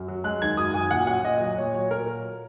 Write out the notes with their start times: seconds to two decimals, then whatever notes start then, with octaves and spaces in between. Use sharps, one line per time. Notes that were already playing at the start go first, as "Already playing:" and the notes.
Already playing: F#2
0.08 F#3
0.24 G#3 F#6
0.42 D#3 G#6
0.57 F#2 D#6
0.74 F#2 G#5
0.91 A#2 F#5
1.07 F#3 F#5
1.25 A#2 D#5
1.41 F#3 D#5
1.58 A#2 C#5
1.75 F#3 C#5
1.91 A#2 A#4